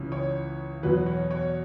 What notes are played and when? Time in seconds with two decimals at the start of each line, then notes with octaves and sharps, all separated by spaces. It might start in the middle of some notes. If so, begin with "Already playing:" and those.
Already playing: C#2 C#3 E3
0.12 C#5
0.83 E2 B2 F#3 B4
1.06 C#5
1.31 C#5